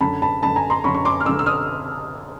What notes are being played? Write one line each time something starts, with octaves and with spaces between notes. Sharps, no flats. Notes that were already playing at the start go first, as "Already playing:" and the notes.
F#2 D3 A5 B5
A5 B5
F#2 D3 A5 B5
G#5 A#5
A#5 C6
F#2 D3 B5 C#6
C#6
C6 D6
F6
F#2 D3 D6 E6
E6
D#6 F6